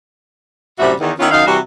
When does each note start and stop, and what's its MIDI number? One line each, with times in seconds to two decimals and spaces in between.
0.79 0.93 42
0.79 0.93 45
0.79 0.93 48
0.79 0.93 55
0.79 0.93 66
0.79 0.93 76
1.00 1.12 40
1.00 1.12 51
1.19 1.28 51
1.19 1.28 59
1.19 1.28 61
1.19 1.28 64
1.19 1.28 65
1.31 1.46 42
1.31 1.46 51
1.31 1.46 63
1.31 1.46 77
1.46 1.58 48
1.46 1.58 52
1.46 1.58 55
1.46 1.58 66